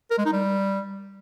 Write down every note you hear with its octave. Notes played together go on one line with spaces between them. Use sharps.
A#4
G#3
D#4
G3